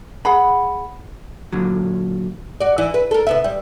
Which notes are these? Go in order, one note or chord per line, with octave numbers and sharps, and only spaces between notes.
G#4 F#5 B5
A#2 D3 F#3
F#4 D5
E3 E4
B4
A4 A#4
C3 B3 E5
G3